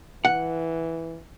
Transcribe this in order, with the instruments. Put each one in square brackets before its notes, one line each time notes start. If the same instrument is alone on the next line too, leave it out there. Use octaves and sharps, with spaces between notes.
[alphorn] E3 [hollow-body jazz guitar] F#5